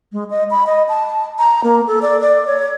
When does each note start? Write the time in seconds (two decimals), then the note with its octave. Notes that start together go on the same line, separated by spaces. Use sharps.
0.13 G#3
0.30 D#5
0.51 B5
0.67 D#5
0.89 A5
1.39 A#5
1.64 A#3
1.87 A4
2.02 D5
2.21 D5
2.47 C#5